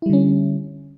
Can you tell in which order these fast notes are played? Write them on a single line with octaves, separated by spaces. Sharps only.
E4 G3 D3 C#4